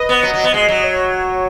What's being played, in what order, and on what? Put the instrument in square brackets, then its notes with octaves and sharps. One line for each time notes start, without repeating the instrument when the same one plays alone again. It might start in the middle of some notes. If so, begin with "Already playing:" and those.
Already playing: [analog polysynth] B4 D#5
[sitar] B3
[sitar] F#3 [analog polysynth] D#5
[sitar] F#3
B3
G#3
F#3
[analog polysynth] C#5